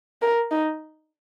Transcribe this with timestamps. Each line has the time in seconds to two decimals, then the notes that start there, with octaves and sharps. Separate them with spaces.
0.22 A#4
0.51 D#4